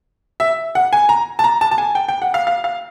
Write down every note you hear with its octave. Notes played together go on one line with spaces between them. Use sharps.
E5
F#5
G#5
A#5
A5
A#5
A5
A5
G#5
G5
G5
F#5
F5
F5
F5